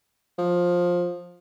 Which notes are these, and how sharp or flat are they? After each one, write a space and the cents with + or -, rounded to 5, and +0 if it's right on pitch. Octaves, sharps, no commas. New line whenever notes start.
F3 +15